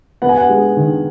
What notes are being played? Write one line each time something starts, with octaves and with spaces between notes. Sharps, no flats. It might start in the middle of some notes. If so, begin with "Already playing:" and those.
B3 F#5
G#5
F#5
G#3
D#3